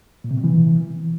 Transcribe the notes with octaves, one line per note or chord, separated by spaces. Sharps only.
A#2
C3
B2
E3